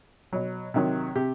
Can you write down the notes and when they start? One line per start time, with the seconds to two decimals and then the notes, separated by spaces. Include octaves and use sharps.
0.33 B2 F#3
0.74 C3 D#3 F#3
1.16 C3 G4